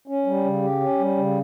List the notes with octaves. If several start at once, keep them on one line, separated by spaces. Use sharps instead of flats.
C#4
G3
C#3
G4
C#4
G3
C#3